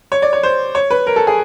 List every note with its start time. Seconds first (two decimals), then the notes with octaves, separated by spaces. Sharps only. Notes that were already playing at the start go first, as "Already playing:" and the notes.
0.12 C#5
0.22 D5
0.33 C#5
0.43 C5
0.75 C#5
0.91 B4
1.07 A#4
1.16 A4
1.27 G#4